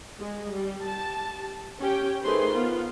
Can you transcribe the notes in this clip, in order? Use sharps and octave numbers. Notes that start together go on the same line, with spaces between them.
G#3
G3
G4 A5
C#4 G4 G5
D#3 A3 G#4 B4 C5 C6
B3 F4